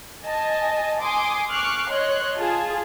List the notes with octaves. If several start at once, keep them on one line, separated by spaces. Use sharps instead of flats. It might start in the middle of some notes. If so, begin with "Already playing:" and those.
D#5 G#5 A5
G#5 C6 D6 D#6
C#6 D6 F6 F#6 C7
C#5 D#5 C6 F#6
F4 G#4 A5